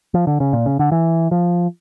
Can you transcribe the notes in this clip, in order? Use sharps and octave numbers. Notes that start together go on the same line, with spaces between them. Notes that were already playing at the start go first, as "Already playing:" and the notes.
F3
D3
C#3
A#2
C#3
D3
E3
F3